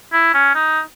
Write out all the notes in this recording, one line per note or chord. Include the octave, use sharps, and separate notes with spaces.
E4
C#4
D#4